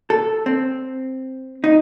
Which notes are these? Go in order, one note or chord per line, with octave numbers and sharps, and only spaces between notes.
A4
C4
D#4